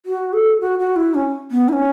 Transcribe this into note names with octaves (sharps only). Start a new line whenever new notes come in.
F#4
A4
F#4
F#4
E4
C#4
B3
E4
C#4